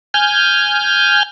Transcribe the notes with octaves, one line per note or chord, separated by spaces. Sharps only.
G#5 F6 G6